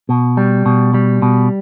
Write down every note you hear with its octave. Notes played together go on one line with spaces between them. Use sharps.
B2
G3
B2
G3
B2